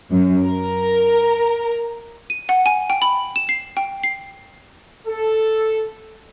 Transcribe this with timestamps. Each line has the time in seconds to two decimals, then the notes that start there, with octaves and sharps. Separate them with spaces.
0.11 F#2
0.46 A#4
2.30 D#7
2.49 F#5
2.66 G#5
2.90 G5
3.02 B5
3.36 E7
3.49 C7
3.77 G5
4.03 C7
5.07 A4